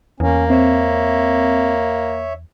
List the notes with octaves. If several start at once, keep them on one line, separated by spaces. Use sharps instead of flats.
E2 A#3 C#4
C4 C#5 E5